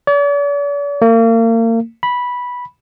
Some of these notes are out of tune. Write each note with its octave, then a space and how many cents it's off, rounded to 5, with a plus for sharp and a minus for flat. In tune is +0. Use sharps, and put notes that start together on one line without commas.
D5 -45
A#3 -35
B5 -10